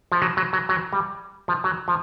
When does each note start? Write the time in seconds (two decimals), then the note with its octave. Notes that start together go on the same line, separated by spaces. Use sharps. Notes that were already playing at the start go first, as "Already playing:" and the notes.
0.12 F3
0.22 F#3
0.37 F#3
0.53 F#3
0.69 F#3
0.93 G3
1.48 F3
1.64 F#3
1.88 F3